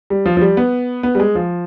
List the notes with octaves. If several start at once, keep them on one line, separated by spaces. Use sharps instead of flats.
G3
F3
F3
G3
B3
B3
G3
G#3
F3